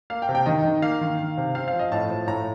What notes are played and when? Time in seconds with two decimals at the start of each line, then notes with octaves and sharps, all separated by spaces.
0.10 A#3 F5
0.22 G5
0.29 C3
0.35 G5
0.46 D#3 D#5
0.65 D#3
0.82 A#3 F5
1.01 D#3
1.19 D#3
1.37 C3
1.55 C4 F5
1.68 F5
1.73 F3
1.79 D#5
1.92 A2 A5
2.10 F3
2.27 A2 A#5